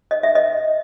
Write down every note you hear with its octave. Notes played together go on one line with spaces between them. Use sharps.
D#5
E5
D#5